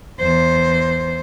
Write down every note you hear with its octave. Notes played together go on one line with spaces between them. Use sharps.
E2 C5